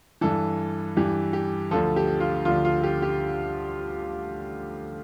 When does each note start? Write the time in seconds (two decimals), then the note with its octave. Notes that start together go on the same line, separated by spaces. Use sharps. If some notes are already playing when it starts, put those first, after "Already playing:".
0.21 G2 E3 A4
0.97 G2 E3 G4
1.33 G4
1.71 D2 D3 F3 A4
1.96 G4
2.20 F4
2.45 D2 D3 F3 F4
2.65 F4
2.83 G4
3.02 G4